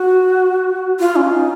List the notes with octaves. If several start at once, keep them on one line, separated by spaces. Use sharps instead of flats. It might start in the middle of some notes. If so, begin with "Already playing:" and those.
Already playing: F#4
F4
C#4
D#4